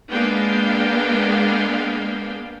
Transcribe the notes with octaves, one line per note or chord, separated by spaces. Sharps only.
G#3 A#3 B3 D4 F5 G5